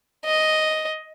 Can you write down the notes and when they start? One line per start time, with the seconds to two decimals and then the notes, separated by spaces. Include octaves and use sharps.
0.25 D#5